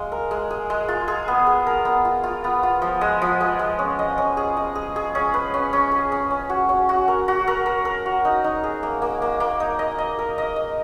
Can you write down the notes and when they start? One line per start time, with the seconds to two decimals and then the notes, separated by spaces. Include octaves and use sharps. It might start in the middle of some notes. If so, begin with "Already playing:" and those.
Already playing: G#3 F5
0.12 A#4
0.31 G#3
0.50 G#4
0.70 G#3
0.88 F4
1.08 G#4
1.28 B3
1.47 G#4
1.67 A#4
1.85 B3
2.05 F4
2.24 F4
2.44 B3
2.63 F4
2.82 F3
3.01 G#3
3.22 F3
3.40 G#3
3.59 G#3
3.79 C#4
3.99 D#5
4.18 C#4
4.37 G#4
4.57 D#5
4.75 G#4
4.96 G#4
5.15 C#4
5.34 B4
5.54 C#4
5.73 C#4
5.92 G#4
6.12 C#4
6.31 C#4
6.50 F#4
6.69 C#4
6.89 F#4
7.08 A#4
7.28 F#4
7.48 A#4
7.66 A#4
7.85 A#4
8.06 F#4
8.25 D#4
8.44 D#4
8.64 G#4
8.83 A#3
9.02 A#3
9.22 A#3
9.40 A#3
9.60 D#4
9.79 D#5
9.98 D#5
10.19 A#4
10.38 D#5
10.56 D#5